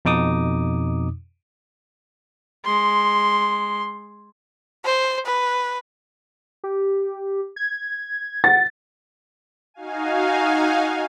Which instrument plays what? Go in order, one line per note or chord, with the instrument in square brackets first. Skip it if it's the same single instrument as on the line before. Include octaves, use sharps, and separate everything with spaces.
[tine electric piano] F2 B2 D#4 D6 D#6
[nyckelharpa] G#3 C6
[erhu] C5
B4
[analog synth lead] G4
G#6
[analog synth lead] F#5 [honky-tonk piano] A6
[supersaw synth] D#4 F#4 F5 G#5